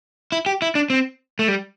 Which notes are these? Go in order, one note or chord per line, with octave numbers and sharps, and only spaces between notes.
E4
G4
E4
D4
C4
A3
G3